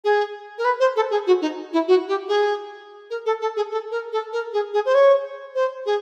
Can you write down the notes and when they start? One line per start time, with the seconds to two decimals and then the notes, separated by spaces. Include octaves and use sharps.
0.04 G#4
0.58 A#4
0.65 B4
0.80 C5
0.96 A4
1.11 G#4
1.27 F#4
1.41 D#4
1.73 E4
1.88 F#4
2.08 G4
2.28 G#4
3.10 A#4
3.26 A4
3.41 A4
3.56 G#4
3.71 A4
3.91 A#4
4.12 A4
4.33 A#4
4.53 G#4
4.74 G#4
4.85 C5
4.94 C#5
5.55 C5
5.86 G#4